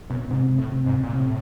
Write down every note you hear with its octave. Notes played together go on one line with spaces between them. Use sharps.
F#2 B2
G#2 C3
A2
C3
G#2
A#2
A2 C3